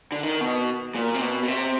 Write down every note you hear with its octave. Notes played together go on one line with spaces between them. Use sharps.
D3
D#3
B2
A#2
C3
B2
B2
C3